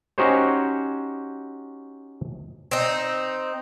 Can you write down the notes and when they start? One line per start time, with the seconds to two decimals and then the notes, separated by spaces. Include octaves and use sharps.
0.18 C#4 D#4 F#4 G4 C5 C#5
2.71 C4 D#4